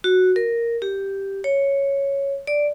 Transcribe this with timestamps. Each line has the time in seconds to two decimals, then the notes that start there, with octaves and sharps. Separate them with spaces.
0.04 F#4
0.36 A#4
0.82 G4
1.44 C#5
2.47 D5